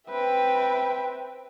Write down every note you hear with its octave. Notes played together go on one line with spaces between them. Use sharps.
C4 B4 E5 G5